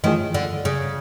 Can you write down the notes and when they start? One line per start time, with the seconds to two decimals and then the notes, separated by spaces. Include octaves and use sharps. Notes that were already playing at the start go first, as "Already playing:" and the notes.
0.04 D#3 E3 A3 C#4 F4 G#4
0.34 D3
0.65 C#3